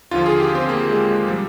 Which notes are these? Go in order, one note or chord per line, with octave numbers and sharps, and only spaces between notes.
D#2 D3 F3 F4
G#4
G4
C4
A#3
G#3
G#3
C3 F3 G3